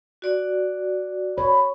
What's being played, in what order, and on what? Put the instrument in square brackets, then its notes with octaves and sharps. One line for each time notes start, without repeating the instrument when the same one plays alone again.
[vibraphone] F#4 D5
[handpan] C#5 [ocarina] B5